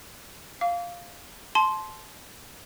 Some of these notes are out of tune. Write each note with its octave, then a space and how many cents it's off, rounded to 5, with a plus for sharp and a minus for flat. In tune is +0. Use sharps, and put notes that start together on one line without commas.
F5 +0 D6 -40
A5 -25 C6 +0